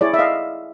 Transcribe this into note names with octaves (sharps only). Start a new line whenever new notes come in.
E4 G#4 C#5 D5
E5
D#5 F5